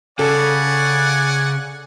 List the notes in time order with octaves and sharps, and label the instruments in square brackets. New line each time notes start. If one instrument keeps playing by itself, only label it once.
[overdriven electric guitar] C#3 [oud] A4 [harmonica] D5 F#5 G#5